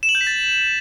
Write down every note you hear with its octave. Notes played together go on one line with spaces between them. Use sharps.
E7
F#7
G6
B6
A6